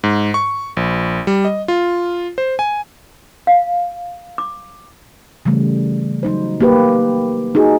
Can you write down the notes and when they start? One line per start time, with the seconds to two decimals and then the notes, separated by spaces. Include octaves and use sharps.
0.04 G#2
0.34 C#6
0.77 A#1
1.27 G3
1.45 D#5
1.68 F4
2.38 C5
2.59 G#5
3.47 F5
4.38 D6
5.46 C#3 E3 G3 A3
6.23 F#3 D#4 C5
6.61 A#3 G4 B4
7.55 D#4 F#4 G#4